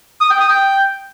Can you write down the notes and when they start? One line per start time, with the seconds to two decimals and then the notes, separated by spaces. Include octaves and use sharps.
0.21 D#6
0.30 G5
0.40 D#6
0.49 G5